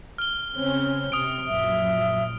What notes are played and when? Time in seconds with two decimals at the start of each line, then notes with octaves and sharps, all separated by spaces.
0.18 F6 G7
0.54 C#3 C4 C#4
1.12 C3 D#6 F6 D7
1.47 A#1 F#2 F#3 E5